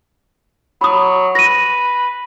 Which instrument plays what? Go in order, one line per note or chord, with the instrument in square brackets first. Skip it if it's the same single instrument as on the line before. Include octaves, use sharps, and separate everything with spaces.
[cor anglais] F#3 [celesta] B5 D#6
[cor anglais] B4 [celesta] A#6 D#7